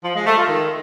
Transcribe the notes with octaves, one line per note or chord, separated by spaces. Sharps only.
F3
G#3
A3
F4
D#3